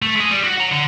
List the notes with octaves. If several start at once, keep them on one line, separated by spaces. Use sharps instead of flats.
A3
G#3 G#4
G3
F#4 F#5
F#5 A#5
D3